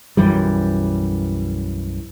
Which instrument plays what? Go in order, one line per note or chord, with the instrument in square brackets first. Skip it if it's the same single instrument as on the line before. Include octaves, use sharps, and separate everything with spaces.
[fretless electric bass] B1 F#2 E3 G3